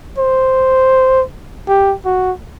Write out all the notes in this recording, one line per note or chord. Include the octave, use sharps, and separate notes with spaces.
C5
G4
F#4